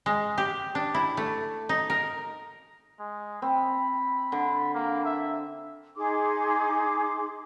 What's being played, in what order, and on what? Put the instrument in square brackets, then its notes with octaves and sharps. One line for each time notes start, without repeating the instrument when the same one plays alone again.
[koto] G#3
G4
D4
E4
A3
D#4
A#4
[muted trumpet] G#3
[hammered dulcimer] C4 [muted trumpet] B5
[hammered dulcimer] D3
[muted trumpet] A#3
E5
[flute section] D#4 G#4 C6 D6